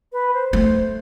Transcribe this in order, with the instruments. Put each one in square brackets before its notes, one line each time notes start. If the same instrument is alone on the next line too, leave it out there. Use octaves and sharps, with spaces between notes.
[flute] B4
C5
[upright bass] A3